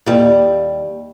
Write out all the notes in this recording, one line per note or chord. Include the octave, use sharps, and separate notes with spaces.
D#2 G3